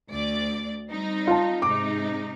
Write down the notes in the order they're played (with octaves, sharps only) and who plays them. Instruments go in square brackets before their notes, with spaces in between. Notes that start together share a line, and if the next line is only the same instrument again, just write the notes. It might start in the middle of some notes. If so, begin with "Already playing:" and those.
[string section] D2 D5
G3 C4 D#4
[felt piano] F4 A5
[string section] G#2 C3 D#4 [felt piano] D6